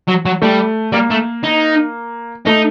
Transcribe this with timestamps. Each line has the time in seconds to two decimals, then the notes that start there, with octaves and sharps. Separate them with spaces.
0.08 F#3
0.26 F#3
0.42 G3 A3
0.93 G3 A#3
1.11 A3
1.44 D#4
2.46 A3 D#4